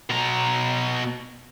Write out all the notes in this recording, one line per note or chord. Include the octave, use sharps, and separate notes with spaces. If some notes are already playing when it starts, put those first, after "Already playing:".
B2 A#5